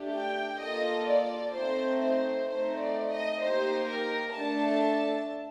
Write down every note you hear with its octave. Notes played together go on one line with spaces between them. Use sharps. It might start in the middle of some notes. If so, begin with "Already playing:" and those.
Already playing: A3 D4 G4
G5
A#3 F4 A4 D#5
D5
A3 C4 D#4 C5
C5
A3 C4 D#4 C5
D5
D#5
A#3 D#4 G4 C5
A#4
A3 D4 A4 A5